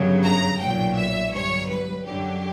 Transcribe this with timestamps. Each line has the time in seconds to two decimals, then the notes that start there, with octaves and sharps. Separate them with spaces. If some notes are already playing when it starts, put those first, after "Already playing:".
Already playing: G1 F#2 C#3 F#3
0.24 A#5
0.60 B1 A#2 F#3 G5
0.97 E5
1.33 G1 G2 F#3 C#5
1.69 B4
2.05 F#2 D3 F#3 G4